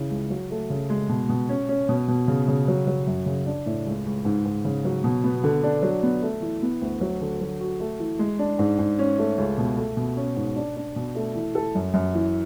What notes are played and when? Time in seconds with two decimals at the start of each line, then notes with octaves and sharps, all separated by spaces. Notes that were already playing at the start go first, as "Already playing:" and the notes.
Already playing: C#3 E3
0.11 C#2
0.30 F#3
0.51 A3
0.70 C#3
0.90 G#3
1.09 B2
1.29 B2
1.49 C#4
1.69 C#4
1.89 B2
2.08 B2
2.28 C#3
2.48 C#3
2.68 F#3
2.87 F#3
3.07 F#2
3.26 C#3
3.46 D4
3.66 A2
3.86 C#2
4.06 C#2
4.25 G#2
4.45 G#2
4.65 C#3
4.85 F#3
5.04 B2
5.24 B3
5.44 D3
5.63 D4
5.82 F#3
6.03 B3
6.22 A3
6.42 E3
6.62 B3
6.81 D2
7.01 F#3
7.21 D3
7.41 F#3
7.60 F#4
7.80 A3
8.00 E3
8.19 G#3
8.39 D4
8.59 G#2
8.79 G#2
8.99 C#4
9.18 A3
9.38 C#2
9.58 B2
9.77 A3
9.97 B2
10.17 C#4
10.36 G#2
10.56 D4
10.77 D4
10.96 B2
11.15 A3
11.35 E3
11.55 A4
11.75 F#2
11.94 F#2
12.14 E3